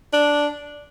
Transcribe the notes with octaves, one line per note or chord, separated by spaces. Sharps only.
D4